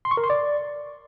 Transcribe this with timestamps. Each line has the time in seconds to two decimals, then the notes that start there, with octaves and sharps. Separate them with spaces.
0.05 C6
0.11 C#6
0.17 A#4
0.24 C6
0.30 D5